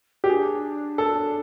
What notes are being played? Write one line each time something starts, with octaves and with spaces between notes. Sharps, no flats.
G4
D4 G#4
A4